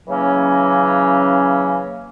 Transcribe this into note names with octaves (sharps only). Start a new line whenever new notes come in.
C#3 E3 F#3 A#3 C#4